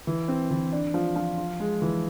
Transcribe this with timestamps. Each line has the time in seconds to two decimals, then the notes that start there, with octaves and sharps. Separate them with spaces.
0.07 E3
0.28 C4
0.51 E3
0.72 D4
0.94 F3
1.16 F3
1.38 F4
1.60 G#3
1.82 E3